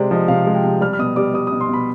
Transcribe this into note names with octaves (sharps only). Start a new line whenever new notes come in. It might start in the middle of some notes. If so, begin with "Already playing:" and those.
Already playing: C3 G#3 C5 D5
F3 D#5
C3 F5
G#3
G5
C3
G3 F6
F6
B2 D#6
G3 D6
G3 D#6
D#6
B2
C6
B2 B5